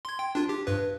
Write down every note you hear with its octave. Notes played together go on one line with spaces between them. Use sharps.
C6 G#6
G5
D4 F4
G4
G2 B4